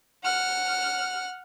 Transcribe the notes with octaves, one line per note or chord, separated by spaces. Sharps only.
F#5 F6